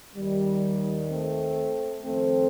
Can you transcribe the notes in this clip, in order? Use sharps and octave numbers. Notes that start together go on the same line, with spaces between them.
D#2 D#3 G3
A3 C4
F2 D#3 A3 C4